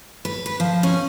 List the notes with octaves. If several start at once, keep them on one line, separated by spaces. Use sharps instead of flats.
B4
B4
F3
C#4